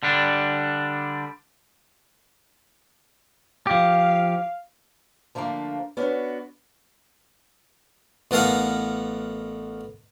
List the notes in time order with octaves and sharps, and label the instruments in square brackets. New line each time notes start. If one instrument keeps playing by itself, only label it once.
[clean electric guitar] D3 G3 D4
[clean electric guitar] F3 G4 [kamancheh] F5
[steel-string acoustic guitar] D3 F3 A3 A#3 D4
B3 C#4 D4 F#4
[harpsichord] A1 B3 A4 A#4 F5 F#5